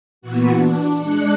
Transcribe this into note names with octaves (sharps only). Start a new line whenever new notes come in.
A#2 E3 B3 F#4
D4
G#3 D4 F#6 C#7